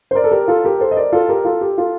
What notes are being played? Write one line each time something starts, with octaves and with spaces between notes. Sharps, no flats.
C5
A#4 D5
A4
G4 A#4
F4 A4
G4 A#4
A4 C5
D#5
A#4 D5
F4 A4
G4 A#4
F4 A4
G4
F4 A4